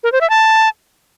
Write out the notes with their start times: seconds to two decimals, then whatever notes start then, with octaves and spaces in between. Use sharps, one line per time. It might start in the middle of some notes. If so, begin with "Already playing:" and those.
0.04 A#4
0.12 C5
0.21 E5
0.30 A5